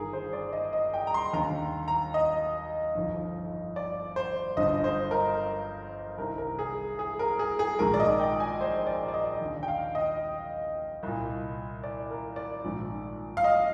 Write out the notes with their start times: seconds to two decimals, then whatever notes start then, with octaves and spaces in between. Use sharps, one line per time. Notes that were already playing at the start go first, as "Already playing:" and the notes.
Already playing: G1 G2 D#3 G#4 A#4
0.13 C5
0.33 D5
0.53 D#5
0.73 D#5
0.94 G5
1.07 A#5
1.14 C6
1.33 D#2 D3 A#5
1.88 A#5
2.14 D#5
2.95 G1 F2 D#3
3.76 D5
4.16 C5
4.57 G1 G2 D3 D#5
4.84 C5
5.11 A#4
6.18 C2 C3 D#3 A#4
6.38 A#4
6.59 G#4
6.99 G#4
7.19 A#4
7.39 G#4
7.59 G#4
7.79 A#1 G#2 D#3 A#4
7.94 D5
8.00 D#5
8.19 G5
8.40 G#5
8.61 C5
8.87 D5
9.08 D5
9.14 D#5
9.41 D#2 D3
9.63 G5
9.68 F5
9.95 D#5
11.03 C2 A#2
11.84 D5
12.11 A#4
12.36 D5
12.64 A#1 G#2 D#3
13.37 F5
13.44 D#5